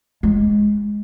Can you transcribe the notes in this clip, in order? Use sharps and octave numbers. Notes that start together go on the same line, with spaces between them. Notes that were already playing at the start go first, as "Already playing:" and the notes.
G#3